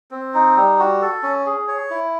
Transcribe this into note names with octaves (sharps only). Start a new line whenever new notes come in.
C4
D#4
G3
F#4
A4
C#4
G#4
C#5
E4